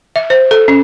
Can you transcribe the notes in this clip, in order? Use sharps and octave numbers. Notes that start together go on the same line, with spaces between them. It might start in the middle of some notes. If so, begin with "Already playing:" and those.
E5
C5
A4
C#4